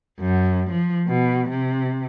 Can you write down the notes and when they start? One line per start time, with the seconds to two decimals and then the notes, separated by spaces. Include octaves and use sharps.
0.20 F#2
0.71 F3
1.08 B2
1.50 C3